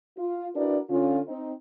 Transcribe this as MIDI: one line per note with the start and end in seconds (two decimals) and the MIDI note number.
0.18 0.47 65
0.56 0.78 62
0.56 0.78 64
0.56 0.78 66
0.56 0.78 70
0.56 0.78 71
0.56 0.78 74
0.90 1.19 50
0.90 1.19 61
0.90 1.19 65
1.28 1.52 60
1.28 1.52 63